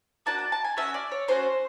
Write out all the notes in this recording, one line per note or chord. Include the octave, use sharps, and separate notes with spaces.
A#3 D4 F#4 A5
A5
A5
G#5
A3 C#4 F#4 E5
D5
C#5
A3 C#4 F#4 C5